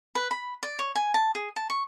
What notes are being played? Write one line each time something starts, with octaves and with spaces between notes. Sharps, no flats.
B4
B5
D5
C#5
G#5
A5
G#4
A5
C#6